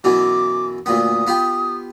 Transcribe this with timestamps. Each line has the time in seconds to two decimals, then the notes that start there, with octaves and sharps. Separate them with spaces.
0.04 F#2 B2 E3 D6
0.86 D2 A#2 B3 D#6
1.27 B3 F4 G4